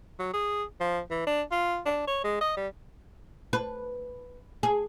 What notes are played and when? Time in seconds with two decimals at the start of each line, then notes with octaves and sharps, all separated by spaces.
0.19 F#3
0.34 G#4
0.80 F3
1.11 E3
1.27 D4
1.51 F4
1.86 D4
2.07 C#5
2.24 G#3
2.41 D#5
2.57 G3
3.53 B4
4.63 G#4